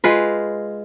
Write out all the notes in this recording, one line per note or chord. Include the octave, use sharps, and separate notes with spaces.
G#3 F4 B4